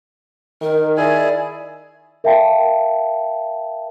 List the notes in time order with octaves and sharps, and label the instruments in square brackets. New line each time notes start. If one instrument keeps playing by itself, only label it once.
[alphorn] D#3 [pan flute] A#4
[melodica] E4 G#4 G#5 [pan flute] D5
[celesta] A#4 E5 F5 G5 A5